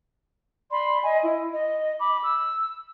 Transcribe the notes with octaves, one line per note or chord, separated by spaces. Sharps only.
D5 B5 C6
D#5 G#5
E4
D#5
B5 D6
E6